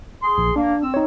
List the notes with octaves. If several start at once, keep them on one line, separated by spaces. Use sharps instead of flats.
G#4 C6
A#1
A#3 D4
C4 E6
D#4 C#5